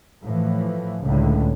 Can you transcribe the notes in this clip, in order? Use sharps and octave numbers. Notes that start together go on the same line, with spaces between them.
A2 E3 F3
C#2 A2 D3